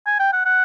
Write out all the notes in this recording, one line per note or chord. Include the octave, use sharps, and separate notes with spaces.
G#5
G5
F#5
F#5